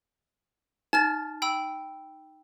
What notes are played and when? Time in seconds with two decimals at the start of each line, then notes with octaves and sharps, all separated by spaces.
0.93 D#4 A5 F6 A6
1.42 G5 B5 E6